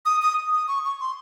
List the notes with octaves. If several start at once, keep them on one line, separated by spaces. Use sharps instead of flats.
D#6
D#6
D#6
C#6
C#6
C6